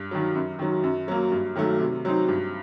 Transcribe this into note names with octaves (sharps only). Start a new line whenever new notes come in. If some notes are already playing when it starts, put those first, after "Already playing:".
Already playing: G2
D#3 F#3
F#2
D#3 F#3
F#2
F#3 A#3
G2
D#3 F#3 A3
C3
F#3 C4 D#4
G2